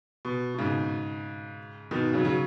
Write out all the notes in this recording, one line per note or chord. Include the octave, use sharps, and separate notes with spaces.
B2
B2
G#2 C#3
B2 D#3
C#3 F#3
C#3 F#3